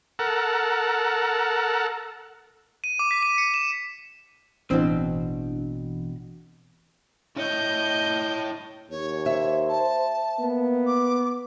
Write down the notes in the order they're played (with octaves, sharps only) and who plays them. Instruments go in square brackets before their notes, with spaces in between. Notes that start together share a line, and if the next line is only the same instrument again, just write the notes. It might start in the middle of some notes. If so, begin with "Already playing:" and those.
[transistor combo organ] A4 A#4 F#5
[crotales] D#7
D6
B6
D#7
C#7
E7
[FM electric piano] A1 E3 D4 [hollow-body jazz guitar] B2 C4
[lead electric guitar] E4 C#5 [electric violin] D#5 G6
[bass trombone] D#2 [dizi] C#5
[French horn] C5 [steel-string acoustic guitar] E5
[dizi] A5
[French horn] A#3 [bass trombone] B3
[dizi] D6